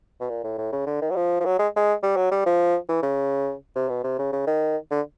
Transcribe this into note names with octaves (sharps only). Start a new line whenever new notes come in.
B2
A#2
A2
A2
C#3
D3
D#3
F#3
F3
F3
F#3
G#3
G#3
G3
F#3
G3
F3
E3
C#3
C3
B2
C3
C#3
C#3
D#3
D3